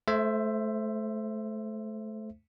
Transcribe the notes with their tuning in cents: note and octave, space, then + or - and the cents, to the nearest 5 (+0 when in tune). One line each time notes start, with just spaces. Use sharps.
A3 -25 C5 +0 E5 +15